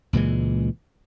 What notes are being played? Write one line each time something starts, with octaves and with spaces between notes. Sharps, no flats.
C#2 A#2 E3 G#3